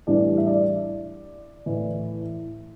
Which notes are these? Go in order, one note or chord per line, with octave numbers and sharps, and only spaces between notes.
A2 E3 G3 D4 D5
E5
D5
A2 E3